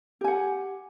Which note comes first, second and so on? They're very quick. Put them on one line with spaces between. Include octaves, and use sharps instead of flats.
G4 G#5 F#5